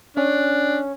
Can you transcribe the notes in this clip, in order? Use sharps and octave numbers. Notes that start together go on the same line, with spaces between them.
C#4 D4